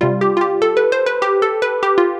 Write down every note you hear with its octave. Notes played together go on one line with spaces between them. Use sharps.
C3 G3 F4
G4
F4
G4
A4
B4
C5
B4
G4
A4
B4
G4
F4